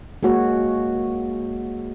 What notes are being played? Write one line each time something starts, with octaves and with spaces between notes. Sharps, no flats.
G#3 A#3 F#4 C#5